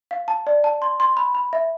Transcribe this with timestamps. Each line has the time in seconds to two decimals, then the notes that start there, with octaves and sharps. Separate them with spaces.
0.11 F5
0.28 A5
0.47 D5
0.64 A5
0.82 C6
1.00 C6
1.17 B5
1.35 B5
1.53 E5